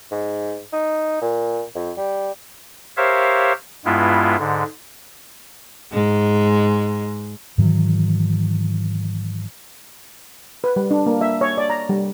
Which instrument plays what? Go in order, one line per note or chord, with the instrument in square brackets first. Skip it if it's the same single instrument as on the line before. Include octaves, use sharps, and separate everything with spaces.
[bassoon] G#2
D#4
A#2
F2
G3
[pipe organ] G4 A#4 C5 C#5 E5 F5
G2 G#3 B3 E4 F4
G#2 D3
[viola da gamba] G#2 G#3
[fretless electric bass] G#2 D#3 E3 F#3
[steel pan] B4
G3
D4
A#3
E5
C#5
D5
A#5
G3